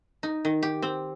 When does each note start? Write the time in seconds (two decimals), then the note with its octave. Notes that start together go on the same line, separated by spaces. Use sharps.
0.23 D#4
0.45 D#3
0.63 G4
0.82 C4